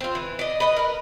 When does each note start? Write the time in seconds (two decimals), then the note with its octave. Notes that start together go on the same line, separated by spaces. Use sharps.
0.01 C4 F4
0.15 E3
0.39 D5 D#5
0.60 B4 D#5
0.76 A#4 B4